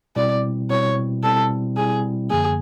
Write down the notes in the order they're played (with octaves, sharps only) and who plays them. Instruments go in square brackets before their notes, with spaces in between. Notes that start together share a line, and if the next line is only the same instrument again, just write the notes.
[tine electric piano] B2 G3 C4 E4 [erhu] D5
[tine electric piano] B2 G3 C4 E4 [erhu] C#5
[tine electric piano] B2 G3 C4 E4 [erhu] A4
[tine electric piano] B2 G3 C4 E4 [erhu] G#4
[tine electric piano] F#2 D3 F3 A#3 [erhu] G#4